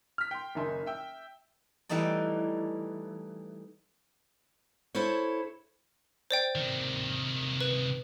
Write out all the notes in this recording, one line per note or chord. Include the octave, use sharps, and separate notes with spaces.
F6 B6
G5 C6
F#1 D#3 D#4 E5 G#5 C6
E5 G5 E6
E3 G3 A3 D#4 D5
E4 A4 C5 C#5
C5 D5 G5
C3 D#3
B4